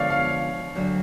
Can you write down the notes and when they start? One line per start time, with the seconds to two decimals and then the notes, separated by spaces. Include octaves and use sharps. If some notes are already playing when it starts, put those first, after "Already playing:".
Already playing: D3 F3 G#3 B3 C#5 D5 F5
0.10 F5
0.75 D2 D3 F#3 A3